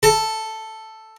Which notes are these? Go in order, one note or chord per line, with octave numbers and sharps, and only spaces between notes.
A4